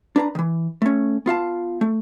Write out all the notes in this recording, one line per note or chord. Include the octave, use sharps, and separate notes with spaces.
D4 B4 A#5
D#3 E3
A3 C#4
B3 F4 F5 A5
A3